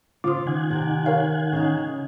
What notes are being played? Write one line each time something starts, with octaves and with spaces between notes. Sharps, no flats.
C#3 F4 C5 D6 D#6
D#3 F#5 G#5
C3
A#4 C#5 F5
C#3 D#4